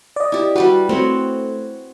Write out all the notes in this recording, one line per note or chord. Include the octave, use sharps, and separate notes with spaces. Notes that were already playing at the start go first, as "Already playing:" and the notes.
D5 D#5
E4 G4
G3 F#4 G4 B4
A3 C4 F#4 C#5